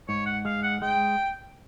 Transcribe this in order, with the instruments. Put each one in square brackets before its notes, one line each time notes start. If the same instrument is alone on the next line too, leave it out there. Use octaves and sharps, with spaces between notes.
[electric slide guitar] G#2 [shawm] C#5
[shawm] F#5
[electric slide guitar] G#3 [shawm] F5
[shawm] F#5
[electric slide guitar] G#3 [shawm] G5